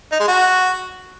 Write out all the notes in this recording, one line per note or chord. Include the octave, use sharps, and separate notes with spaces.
D#4
G#3
F#4